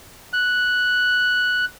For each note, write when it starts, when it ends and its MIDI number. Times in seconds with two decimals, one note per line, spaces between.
0.33 1.65 90